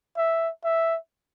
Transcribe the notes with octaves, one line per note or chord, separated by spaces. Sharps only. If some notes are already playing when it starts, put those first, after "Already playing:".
E5
E5